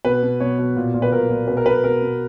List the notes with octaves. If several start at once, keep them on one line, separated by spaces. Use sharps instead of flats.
B2 B4
B2
B2 C#5
B2
A#2
A#2
B4
A#2 A#4
A#2
B2 B4
A#4
B2 B4
B2 A#4
B2